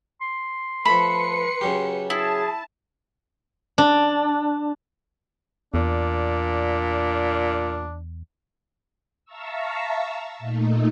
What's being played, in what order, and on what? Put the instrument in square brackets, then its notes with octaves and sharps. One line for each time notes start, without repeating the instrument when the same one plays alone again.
[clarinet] C6
[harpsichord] F3 A3 [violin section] B4 C#7 [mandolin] B5
[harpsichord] C#3 F#3 G4
[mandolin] E4 [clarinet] G#4 [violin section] A5
[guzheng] D4
[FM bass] E2 [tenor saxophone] A#2 [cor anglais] D4
[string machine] E5 F5 A5 A#5 C#6 E6
A#2 A3 D#4